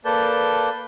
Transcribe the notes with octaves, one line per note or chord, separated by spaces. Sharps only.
A#3 A4 B4 D5 A5 G6